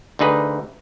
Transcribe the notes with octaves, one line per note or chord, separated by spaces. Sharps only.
D2 D3 D#4 G#4 B4